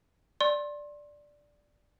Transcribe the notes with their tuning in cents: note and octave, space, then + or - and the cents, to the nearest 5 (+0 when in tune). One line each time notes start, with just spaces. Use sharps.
D5 +0 C6 +30